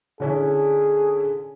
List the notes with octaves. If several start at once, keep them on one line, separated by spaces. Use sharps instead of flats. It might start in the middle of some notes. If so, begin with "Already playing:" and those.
D3 C#4 E4 G#4